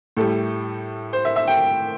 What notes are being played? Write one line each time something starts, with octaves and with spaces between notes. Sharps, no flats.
A2 G3 A4
C5
E5
E5
G5